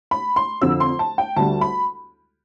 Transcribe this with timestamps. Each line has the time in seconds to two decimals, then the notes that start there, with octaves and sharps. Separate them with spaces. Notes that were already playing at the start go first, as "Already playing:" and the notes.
0.11 B5
0.36 C6
0.61 F2 D3 F3 E6
0.80 C6
0.99 A5
1.18 G5
1.36 D2 D3 G3 A5
1.61 B5